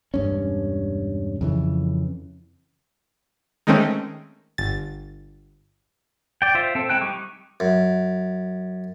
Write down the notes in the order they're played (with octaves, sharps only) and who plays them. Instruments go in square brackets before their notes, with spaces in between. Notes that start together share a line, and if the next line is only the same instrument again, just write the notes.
[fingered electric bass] E1 G2 C#4
F2 C#3 E3
[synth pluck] D#3 G#3 A3 C4 C#4
G1 A6
[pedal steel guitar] D5 G5
F4 C5 E5
C4 A4
G#3 E4 G5 F#6
G3 D#4 C#6 D6
[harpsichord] F#2